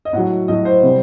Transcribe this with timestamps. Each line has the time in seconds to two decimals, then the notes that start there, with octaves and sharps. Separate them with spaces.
0.05 D#5
0.13 A2 F#3 F#5
0.48 A2 F#3 D#5
0.65 C5
0.83 C3 G3